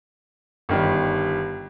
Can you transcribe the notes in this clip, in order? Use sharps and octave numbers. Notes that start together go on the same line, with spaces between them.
G1 D#3 G3